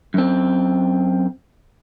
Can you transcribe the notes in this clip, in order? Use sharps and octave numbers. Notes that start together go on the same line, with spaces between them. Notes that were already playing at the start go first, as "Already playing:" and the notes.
F#2 C4